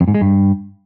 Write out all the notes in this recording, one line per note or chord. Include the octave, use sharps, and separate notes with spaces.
F2
G#2
G#3
G2